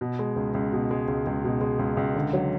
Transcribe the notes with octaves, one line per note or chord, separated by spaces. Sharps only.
B2
G#3
C#2
C#2
B2
G#3
C#2
C#2
B2
G#3
C#2
C#2
D3
F#3